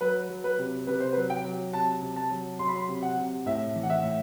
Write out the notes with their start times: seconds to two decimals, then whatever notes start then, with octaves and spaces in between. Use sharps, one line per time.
0.01 F#3 B4
0.29 F#3
0.44 B4
0.58 C3
0.87 C3 B4
1.00 C5
1.13 B4
1.17 F#3
1.30 G5
1.44 F#3
1.73 C3 A5
2.02 C3
2.16 A5
2.31 F#3
2.59 F#3 C6
2.68 B5
2.76 C6
2.89 C3
3.03 F#5
3.17 C3
3.46 A2 E5
3.76 E3
3.83 F#5
3.90 E5
4.03 A2